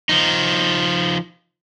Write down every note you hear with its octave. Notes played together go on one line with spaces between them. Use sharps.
F3 D#4